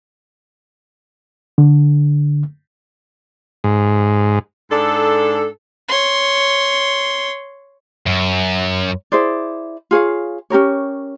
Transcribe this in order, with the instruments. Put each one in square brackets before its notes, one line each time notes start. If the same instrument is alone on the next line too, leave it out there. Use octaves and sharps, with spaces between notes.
[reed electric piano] D3
[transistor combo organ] G#2
[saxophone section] G#2 D4 A4
[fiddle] C#5 C6
[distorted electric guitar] F#2
[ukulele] E4 G#4 C5 D5
F4 G#4 C#5 F5
C#4 G4 A#4 C#5